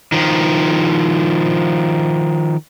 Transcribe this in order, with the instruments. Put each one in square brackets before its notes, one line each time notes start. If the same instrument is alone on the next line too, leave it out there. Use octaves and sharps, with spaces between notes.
[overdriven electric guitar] D#3 F3